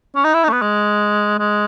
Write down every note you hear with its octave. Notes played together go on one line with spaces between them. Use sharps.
C#4
D#4
E4
D#4
A3
B3
G#3
G#3